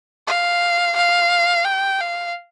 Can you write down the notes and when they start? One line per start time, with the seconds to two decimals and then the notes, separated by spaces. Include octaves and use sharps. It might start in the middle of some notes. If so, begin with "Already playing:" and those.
0.27 F5
0.96 F5
1.65 G5
2.00 F5